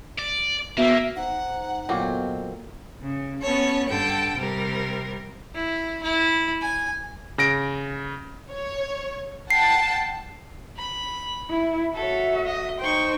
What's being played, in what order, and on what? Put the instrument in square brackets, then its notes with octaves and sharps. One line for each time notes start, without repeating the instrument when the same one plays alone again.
[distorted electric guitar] D5
[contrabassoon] B2 [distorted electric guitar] A#3 [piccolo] E5
[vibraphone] D#4 C5 A#5 [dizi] F#5
[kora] A#2 F#3 [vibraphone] B3 A4 D#5 [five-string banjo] C4
[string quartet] C#3
B3 C#4 A4 C#5
G2 D3 A4 G5
C3 G3 A#4
[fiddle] E4
E4
G#5
[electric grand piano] C#3 A#6 D7
[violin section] C#5
[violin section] F#5 G5 A5 [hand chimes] C7
[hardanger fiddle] B5
[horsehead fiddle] E4
[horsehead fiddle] F#4 E5 [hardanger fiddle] A4 C#5
[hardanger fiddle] D#5
[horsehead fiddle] D#4 C5 [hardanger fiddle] G5 C#6